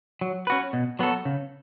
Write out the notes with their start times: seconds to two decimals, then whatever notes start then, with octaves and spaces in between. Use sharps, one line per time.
0.21 F#3
0.47 C#4 F#4 B4
0.73 B2
0.99 F#3 B3 F#4 A4
1.25 C#3